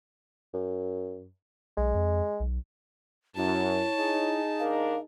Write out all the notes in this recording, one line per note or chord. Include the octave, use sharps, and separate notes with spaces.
F#2
B1 G#3
F2
B1
F#2 E4 C#5 A5
D#4 G#4
D#2 D4 A#4 F5